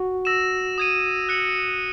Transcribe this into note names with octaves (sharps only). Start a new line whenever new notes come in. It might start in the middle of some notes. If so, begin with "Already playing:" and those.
Already playing: F#4
E6 A#6 E7
D#6 G#6 D#7
F#6 C#7 F#7